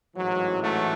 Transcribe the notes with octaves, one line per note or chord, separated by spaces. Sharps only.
A1 G#2 E3 F#3
F#3 A3